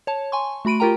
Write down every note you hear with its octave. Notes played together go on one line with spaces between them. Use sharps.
C#5 A5
G#5 C6 C#6
A3 F#4 B5 D7 D#7
F4 G4 A#4 G5 A#5